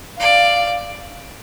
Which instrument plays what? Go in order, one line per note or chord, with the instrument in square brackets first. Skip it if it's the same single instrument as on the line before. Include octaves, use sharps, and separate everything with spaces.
[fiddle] D5 [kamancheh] F5